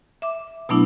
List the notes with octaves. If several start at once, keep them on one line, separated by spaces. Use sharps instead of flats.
E5 D6
B2 F#3 A3 B3 D4 E4